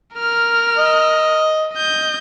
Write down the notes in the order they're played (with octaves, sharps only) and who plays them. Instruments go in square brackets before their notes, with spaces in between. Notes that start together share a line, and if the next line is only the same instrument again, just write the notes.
[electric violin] A#4 F6
[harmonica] D#5
[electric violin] D#5 G6